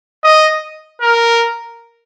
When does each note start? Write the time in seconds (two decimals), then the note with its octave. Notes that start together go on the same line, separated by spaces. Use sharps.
0.24 D#5
1.01 A#4